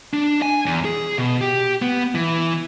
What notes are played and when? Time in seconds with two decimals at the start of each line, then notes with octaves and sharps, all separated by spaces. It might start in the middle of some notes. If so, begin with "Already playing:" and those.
0.14 D4
0.42 G#5
0.66 E2
0.85 G#4
1.18 B2
1.41 G4
1.82 B3
2.15 E3